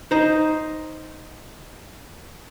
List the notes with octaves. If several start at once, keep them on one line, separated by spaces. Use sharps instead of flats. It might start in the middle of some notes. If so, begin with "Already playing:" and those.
D#4 C5